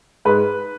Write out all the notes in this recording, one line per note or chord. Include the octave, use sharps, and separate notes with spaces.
G#2 B4